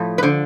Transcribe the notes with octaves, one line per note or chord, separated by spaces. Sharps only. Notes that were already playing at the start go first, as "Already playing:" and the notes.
Already playing: A2 F3
B4
D3 C5